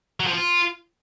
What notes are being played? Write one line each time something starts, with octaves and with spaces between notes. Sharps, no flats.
F#3
F3
F4